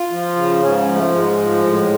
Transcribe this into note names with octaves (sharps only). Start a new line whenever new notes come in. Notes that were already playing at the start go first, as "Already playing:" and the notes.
Already playing: F4
F3
C#3
G#2 C#4
C#4
F3 G#3
A3
G#2 G#3
F3
A2